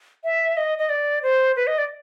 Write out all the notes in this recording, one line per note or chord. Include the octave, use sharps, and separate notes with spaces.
E5
D#5
D#5
D5
C5
B4
D#5
D5